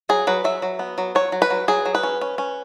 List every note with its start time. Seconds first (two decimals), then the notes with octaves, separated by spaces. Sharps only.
0.09 F#3 G#4
0.27 F#3 B4
0.44 F#3 E5
0.62 F#3
0.79 B3
0.98 F#3
1.15 F#3 C#5
1.32 F#3
1.42 B4
1.50 F#3
1.68 F#3 G#4
1.85 F#3
1.95 B4
2.03 C#4
2.21 C#4
2.38 C#4